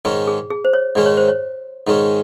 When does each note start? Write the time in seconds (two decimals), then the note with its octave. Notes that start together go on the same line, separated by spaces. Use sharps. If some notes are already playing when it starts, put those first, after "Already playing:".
0.05 G#2 D#3 G#3 C#4 G#4
0.27 G#4
0.50 G#4
0.65 C5
0.73 C#5
0.95 G#2 D#3 G#3 C#4 D5
1.06 C#5
1.17 C5
1.28 C#5
1.87 G#2 D#3 G#3 C#4